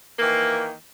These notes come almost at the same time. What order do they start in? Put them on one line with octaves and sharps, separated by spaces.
A#3 E3 D#3